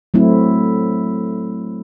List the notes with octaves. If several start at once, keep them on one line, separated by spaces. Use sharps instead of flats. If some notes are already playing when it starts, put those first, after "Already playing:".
F#3 A3 C4 E4